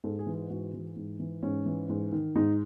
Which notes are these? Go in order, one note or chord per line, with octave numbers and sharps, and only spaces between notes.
G#2 A4
G#4
E3
G#4
G#2 F#4
E3
G#2
E3
G#2 C#4
E3
G#2
D#3
G#2 D#4